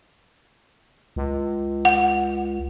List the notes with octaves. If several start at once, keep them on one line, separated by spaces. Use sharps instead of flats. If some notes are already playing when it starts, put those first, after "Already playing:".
C#2
F#5